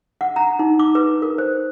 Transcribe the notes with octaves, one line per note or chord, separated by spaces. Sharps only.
F#5
A#5
D#4
D6
B4
A#4
C5